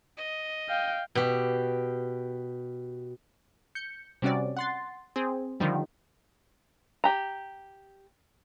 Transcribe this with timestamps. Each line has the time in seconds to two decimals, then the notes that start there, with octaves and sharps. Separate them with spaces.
0.17 D#5
0.69 F5 G5
1.15 B2 G4
3.75 G6 C#7
4.22 C3 G3 C#4 F#4 D5
4.57 F#5 C6 A6
5.16 C4 G#4
5.60 D3 D#3 F3 G3
7.04 G4 A#5